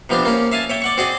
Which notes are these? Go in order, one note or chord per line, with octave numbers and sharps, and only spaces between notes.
C3 F3 B3 C4 D4
A#3 C#4
E5 F5 G#5 A5
C#5 E5 G5
D5 F#5 C#6
C4 F#4 G#4 D5 D#5